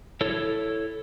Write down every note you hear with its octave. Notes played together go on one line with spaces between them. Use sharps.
E4 A4 C#5